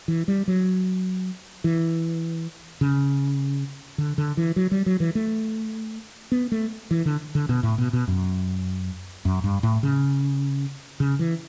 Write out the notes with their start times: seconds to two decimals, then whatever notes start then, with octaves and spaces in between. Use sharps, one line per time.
0.08 E3
0.28 G3
0.48 F#3
1.64 E3
2.81 C#3
3.98 D3
4.18 D3
4.37 E3
4.56 F#3
4.71 G3
4.86 F#3
5.00 E3
5.15 A3
6.32 B3
6.52 A3
6.91 E3
7.06 D3
7.35 D3
7.49 B2
7.63 A2
7.78 B2
7.93 B2
8.08 F#2
9.25 F#2
9.44 G2
9.63 A2
9.83 C#3
11.00 C#3
11.19 E3